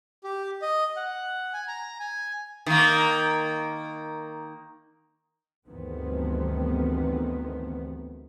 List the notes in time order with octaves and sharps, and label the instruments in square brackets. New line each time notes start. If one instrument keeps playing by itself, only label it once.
[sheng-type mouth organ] G4
D#5
F#5
G#5
A#5
G#5
[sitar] D#3 A#3
[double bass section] D2 G2 D#3 E3 B3 C4